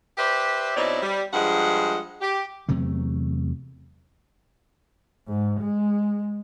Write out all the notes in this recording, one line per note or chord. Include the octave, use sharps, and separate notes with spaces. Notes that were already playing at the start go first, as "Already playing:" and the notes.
G4 B4 C5 D5 E5
B2 C4 D#4 E4 C#5 D5
G3
G2 F3 G#3 G#4 F#5
G4
E2 C3 F#3 A3
G#2
G#3